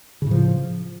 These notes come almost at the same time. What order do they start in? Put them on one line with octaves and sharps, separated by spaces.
C#3 A2 F3